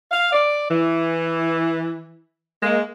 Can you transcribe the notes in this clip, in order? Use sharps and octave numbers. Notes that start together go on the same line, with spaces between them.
F5
D5
E3
G#3 A#3